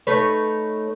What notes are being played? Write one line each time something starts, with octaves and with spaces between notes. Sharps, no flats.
A3 D#4 B4 C#5